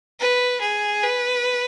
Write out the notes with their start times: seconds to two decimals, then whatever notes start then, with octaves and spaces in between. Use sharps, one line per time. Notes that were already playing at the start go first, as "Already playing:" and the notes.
0.20 B4
0.61 G#4
1.04 B4